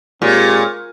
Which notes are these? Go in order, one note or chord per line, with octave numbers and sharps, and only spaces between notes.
A#2 G#3 C4 G4 C#5